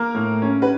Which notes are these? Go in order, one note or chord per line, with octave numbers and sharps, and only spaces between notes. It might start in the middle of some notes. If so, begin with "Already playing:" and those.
Already playing: A#3 A#4
A2
C#4
B4